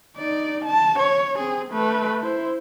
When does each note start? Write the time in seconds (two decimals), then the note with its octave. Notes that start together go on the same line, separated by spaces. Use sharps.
0.17 D#4 D5
0.65 A5
0.99 C#5
1.38 C4 G#4
1.69 A3 B4
2.21 E4 C5